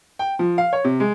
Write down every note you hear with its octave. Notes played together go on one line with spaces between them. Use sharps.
G5
F3
F5
C#5
C3
G#3